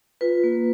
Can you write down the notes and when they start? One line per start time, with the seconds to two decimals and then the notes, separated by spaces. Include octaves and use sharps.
0.21 F4 B4
0.44 A#3